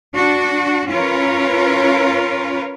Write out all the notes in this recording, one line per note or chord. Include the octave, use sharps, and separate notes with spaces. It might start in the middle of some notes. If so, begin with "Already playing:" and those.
D4 F#4
C#4 F4 A#4 B4 C#5